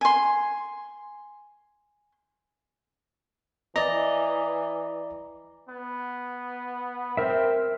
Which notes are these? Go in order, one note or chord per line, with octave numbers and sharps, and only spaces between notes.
G#5 C6
E3 D5 D#5 A#5
B3
C4 A#4 E5